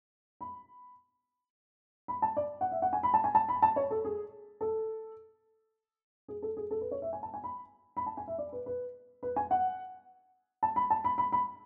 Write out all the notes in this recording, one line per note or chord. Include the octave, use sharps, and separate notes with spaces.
B5
B5
A5
D5
F#5
E5
F#5
G#5
B5
A5
G#5
A5
B5
A5
C#5
A4
G#4
A4
G#4
A4
G#4
A4
B4
C#5
E5
G#5
A5
G#5
B5
B5
A5
G#5
E5
D5
B4
B4
B4
G#5
F#5
A5
B5
A5
B5
B5
B5